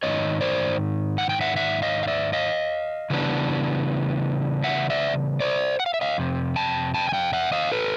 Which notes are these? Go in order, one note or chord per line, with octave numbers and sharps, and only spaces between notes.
G#2 D#3 G#3 C#4 C#5 D#5
C5 D5
F#5
G5
E5 F#5
E5 F#5
D#5 F5
F5
D5 E5
D#5 F5
C#3 E3 G3 B3 D4
E5 F#5
D5 E5
C5 D5
F#5
F5
E5
D#5 F5
F2 C3
G5 A5
G5 A5
G#5
F5 G5
E5 F#5
D#5 F5
A4 B4